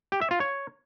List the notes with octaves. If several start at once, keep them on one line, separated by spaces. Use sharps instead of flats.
G4
E5
F4
C#5